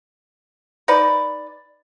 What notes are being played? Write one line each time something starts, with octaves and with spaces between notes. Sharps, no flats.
D#4 B4 D5